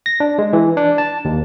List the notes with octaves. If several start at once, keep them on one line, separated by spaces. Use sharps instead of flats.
A#6
D4
G#3
E3
D4
A5
D#2